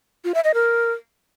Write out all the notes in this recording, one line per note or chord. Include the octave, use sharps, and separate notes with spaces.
F4
E5
D#5
A#4